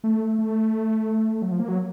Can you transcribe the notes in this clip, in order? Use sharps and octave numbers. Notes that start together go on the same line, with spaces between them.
A3
A3
F#3
F3
A#3
F#3